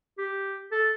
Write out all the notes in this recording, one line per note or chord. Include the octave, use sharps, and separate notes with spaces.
G4
A4